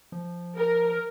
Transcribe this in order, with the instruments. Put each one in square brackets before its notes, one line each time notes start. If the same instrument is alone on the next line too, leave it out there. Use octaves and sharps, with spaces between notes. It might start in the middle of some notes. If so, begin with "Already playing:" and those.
[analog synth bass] F3
[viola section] A#4